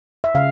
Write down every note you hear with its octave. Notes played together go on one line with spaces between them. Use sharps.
E5
C#3 F5